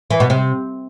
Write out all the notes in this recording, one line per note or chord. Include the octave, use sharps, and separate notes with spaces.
E3
B2
C3